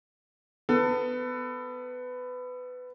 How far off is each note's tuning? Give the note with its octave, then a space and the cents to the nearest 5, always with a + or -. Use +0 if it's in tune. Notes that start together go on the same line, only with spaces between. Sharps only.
B3 +20 A4 +30